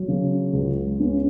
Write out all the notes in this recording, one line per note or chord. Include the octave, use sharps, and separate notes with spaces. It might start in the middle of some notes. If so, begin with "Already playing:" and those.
Already playing: F#3
C#3
C#2
C#4